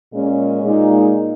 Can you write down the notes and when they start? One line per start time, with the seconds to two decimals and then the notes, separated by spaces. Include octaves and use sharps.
0.11 A#2 G#3 C#4
0.63 A#2 G#3 D#4